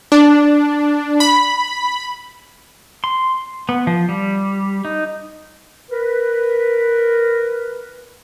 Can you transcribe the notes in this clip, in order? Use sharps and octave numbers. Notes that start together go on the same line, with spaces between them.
D4
B5
C6
B3
F3
G3
D#4
A#4 B4